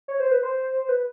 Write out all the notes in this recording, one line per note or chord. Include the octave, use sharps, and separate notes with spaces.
C#5
C5
B4
C5
B4